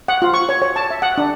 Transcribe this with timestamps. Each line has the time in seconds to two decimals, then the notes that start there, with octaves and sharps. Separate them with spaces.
0.08 F#5
0.22 F4
0.34 C#6
0.49 C#5
0.62 C#5
0.76 A5
0.90 E5
1.02 F#5
1.18 D4